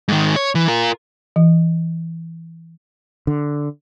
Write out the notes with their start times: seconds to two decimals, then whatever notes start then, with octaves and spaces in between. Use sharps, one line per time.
0.08 G#2 D#3
0.36 C#5
0.55 E3
0.68 F4 A#4
1.36 E3
3.27 D3